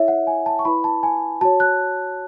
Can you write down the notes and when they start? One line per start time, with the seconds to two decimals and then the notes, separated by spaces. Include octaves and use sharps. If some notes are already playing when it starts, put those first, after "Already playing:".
Already playing: E4 A4 C#5 E5
0.08 F#5
0.27 G#5
0.46 A5
0.59 C#6
0.65 E4 B4 B5
0.84 A5
1.03 G#5
1.41 F#4 C#5 A5
1.60 F#6